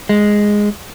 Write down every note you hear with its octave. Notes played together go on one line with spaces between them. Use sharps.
G#3